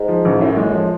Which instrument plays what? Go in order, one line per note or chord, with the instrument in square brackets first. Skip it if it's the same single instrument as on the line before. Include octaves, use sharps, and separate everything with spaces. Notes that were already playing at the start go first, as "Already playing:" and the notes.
Already playing: [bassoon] G#2
[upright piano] F3
A1
[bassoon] F#2 [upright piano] A2
[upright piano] G#3
F3